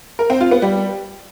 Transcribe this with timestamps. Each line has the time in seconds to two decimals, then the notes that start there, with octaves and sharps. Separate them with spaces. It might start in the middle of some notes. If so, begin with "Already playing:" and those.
0.19 A#4
0.30 C4
0.41 F4
0.51 B3
0.62 G3